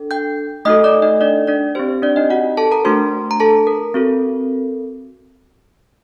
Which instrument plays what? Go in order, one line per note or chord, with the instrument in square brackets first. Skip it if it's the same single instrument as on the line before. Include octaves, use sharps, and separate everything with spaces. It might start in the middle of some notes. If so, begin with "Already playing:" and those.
Already playing: [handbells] D4 A4
G5 G6
A3 D#4 F#4 A4 D#5 D#6
D5 D6
D#4 D#5
D4 D5
D4 D5
C4 G4 C5
C5
D4 D5
D#4 D#5
F#4 F#5
A4 A5
A#4 A#5
A3 D4 F#4 C5 C6
A#5
A4 A5
A#4
C4 F#4 A4